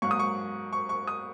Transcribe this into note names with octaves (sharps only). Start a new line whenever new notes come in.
G#2 F#3 A#3 C#6
D#6
C#6
C#6
C#6
D#6